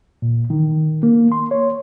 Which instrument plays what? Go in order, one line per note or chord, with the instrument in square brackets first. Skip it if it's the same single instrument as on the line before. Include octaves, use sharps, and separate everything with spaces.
[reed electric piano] A#2
D#3
A#3
C6
C#5